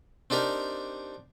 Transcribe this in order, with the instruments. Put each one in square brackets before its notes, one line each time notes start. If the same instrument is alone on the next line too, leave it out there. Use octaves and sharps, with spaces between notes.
[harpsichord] C4 D4 D#4 G4 A#4